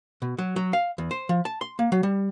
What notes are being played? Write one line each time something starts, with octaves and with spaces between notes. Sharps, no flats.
B2
F#3
F#3
F5
E2
C5
F3
A5
C6
A#3
F#3
G3